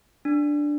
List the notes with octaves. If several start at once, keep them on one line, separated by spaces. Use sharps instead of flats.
D4